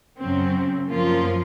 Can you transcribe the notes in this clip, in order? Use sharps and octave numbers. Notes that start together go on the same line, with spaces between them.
F#2 C#3 F#3 C4
F#2 F3 A#3 F4